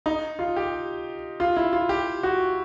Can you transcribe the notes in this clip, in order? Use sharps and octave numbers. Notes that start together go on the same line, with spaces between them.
D#4
F4
G4
F4
E4
F4
G4
F#4